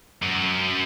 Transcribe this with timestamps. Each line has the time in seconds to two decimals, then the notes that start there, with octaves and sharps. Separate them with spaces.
0.22 F#2